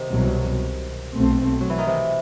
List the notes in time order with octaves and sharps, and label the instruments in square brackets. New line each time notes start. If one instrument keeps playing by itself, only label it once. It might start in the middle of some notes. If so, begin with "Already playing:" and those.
Already playing: [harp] C3 D#3
[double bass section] C2 B2 F#3
B1 B2 A3 C4
[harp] F#3
E3
D#3
C3 E3